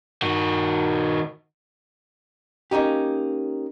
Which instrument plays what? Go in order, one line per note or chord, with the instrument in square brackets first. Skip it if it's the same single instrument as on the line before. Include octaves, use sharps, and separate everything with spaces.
[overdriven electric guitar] D#3 F#4
[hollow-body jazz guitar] A#3 C#4 D#4 G4